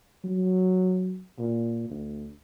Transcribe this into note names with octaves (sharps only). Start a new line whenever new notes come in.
F#3
A#2
D2